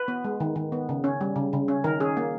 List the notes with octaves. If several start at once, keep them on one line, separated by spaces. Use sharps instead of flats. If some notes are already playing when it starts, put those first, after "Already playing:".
Already playing: B4
B3
G#3
D#3
D#3
B3
C#3
C#4
G3
C#3
C#3
C#4
D#3 A#4
C#4 G#4
A#3